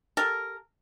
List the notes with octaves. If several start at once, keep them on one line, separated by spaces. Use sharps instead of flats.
G4 A4 A#4